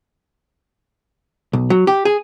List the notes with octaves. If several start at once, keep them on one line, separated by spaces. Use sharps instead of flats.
B1
F#3
G4
G#4